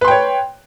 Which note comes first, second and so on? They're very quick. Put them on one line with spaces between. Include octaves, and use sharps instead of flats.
B4 C6 G5 C#5